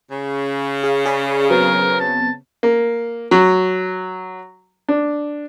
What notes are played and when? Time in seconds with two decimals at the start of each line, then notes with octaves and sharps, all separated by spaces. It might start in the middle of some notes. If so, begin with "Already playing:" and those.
0.10 C#3
0.83 G#4 F5
1.05 G#4 D5 B5
1.50 F#3 B3 C4 A#4
2.00 A5
2.63 A#3
3.31 F#3
4.89 D4